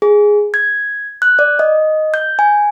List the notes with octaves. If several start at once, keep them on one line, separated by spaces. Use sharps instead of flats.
G#4
G#6
F#6
D5
D#5
G6
G#5